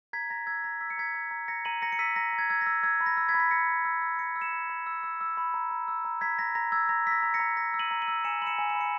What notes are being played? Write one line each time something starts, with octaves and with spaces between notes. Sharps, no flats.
A#5 G#6 B6
A#5 A#6
E6 G#6
A#5 A#6
E6 B6
C#7
A#5 G#6 B6
A#5
A#5
A#5 A#6 C#7
A#5 D#7 F#7
A#5 A#6 C#7
C#7
E6 B6 D#7
A#5 A#6
A#5
G#6
E6 G#6
A#6
E6
E6 G#6
B5
A#6
E6
G#6 B6
B5
B6
E6 A#6 C#7
E6
E6
E6
E6 A#6 C#7
E6
C#7 E7
B5
B5
E6
E6
E6
B5
A#5
A#5
E6
A#5
A#5 G#6 B6
A#5 A#6
A#5 A#6
E6 G#6
A#5 A#6
E6 A#6 B6
A#5
A#6 C#7
A#5
A#5 A#6
E6
D#7 F#7
A#5
D#7 F#7
E6
G#5 C#7 E7
B5 F#7
C#7 E7
G#5
C#7 E7
B5
C#7